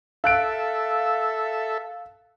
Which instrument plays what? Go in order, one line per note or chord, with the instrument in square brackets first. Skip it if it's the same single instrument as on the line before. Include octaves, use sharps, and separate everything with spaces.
[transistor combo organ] A4 E5 [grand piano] F5 F#6 D7